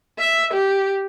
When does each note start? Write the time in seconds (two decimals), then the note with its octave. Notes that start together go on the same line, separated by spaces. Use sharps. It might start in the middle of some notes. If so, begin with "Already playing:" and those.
0.19 E5
0.53 G4